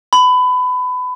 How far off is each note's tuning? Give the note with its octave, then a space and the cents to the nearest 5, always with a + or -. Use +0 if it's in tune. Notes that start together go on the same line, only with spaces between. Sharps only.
B5 +25